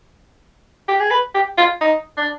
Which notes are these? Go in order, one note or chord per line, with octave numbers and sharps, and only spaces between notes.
G4
G#4
B4
G4
F4
D#4
D4